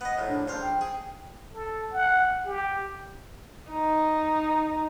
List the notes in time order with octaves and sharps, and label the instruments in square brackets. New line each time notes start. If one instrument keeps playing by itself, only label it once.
[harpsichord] B3 D#5
A#1 A2
[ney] D4
[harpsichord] A#1 C5 F5
[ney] G5
[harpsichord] G#4
[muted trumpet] A4
F#5
G4
[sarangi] D#4